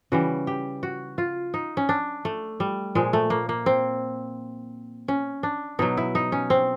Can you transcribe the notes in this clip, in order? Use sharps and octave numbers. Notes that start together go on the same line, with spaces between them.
C#3 E3 G3 F#4
G4
F#4
F4
D#4
C#4
D4
A3
G3
A#2 F3 G#3
A3
A#3
A#3
C4
C#4
D4
B2 F#3 D#4
E4
D#4
C#4
C4